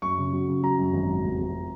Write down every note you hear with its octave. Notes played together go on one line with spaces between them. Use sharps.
F#2 C#6
C#3
F#3
C#3
F#3 A#5
F#2
G#1
F#3
F1
F1